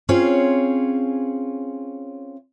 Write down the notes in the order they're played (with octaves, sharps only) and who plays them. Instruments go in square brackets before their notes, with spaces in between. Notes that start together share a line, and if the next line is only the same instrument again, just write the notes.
[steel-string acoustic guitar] C4 C#4 F4 G#4 C#5